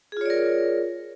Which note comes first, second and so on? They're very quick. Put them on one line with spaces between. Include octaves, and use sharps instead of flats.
G#4 F4 C#5 D5 A#4